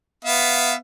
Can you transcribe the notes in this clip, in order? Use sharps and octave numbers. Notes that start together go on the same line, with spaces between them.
B3 E5 F5